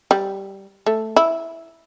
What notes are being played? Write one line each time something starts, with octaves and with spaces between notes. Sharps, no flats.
G3
A3
E4